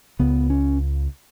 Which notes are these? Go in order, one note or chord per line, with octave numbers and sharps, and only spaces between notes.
C#2 C#3 B3
C#4